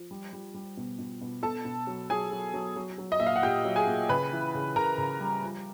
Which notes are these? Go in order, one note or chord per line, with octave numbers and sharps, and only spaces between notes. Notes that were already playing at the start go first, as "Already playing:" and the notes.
Already playing: F3
G3
G3
G3
B2
B2
B2
B2 A4 A5
B2
F#3
F#3 G#4 G#5
F#3
F#3
F#3
F#3
D#5
A#2 E5
F5
F#5
A#2 G4 G5
F#3
G#4 G#5
A#2
C#3 B4 B5
E3
C#3
C#3 A#4 A#5
C#3
G3
F3